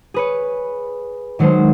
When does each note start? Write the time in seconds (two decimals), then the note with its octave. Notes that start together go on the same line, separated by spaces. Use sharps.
0.14 G#4 B4 C#5
1.39 D#3 F#3 G#3 D#4 C5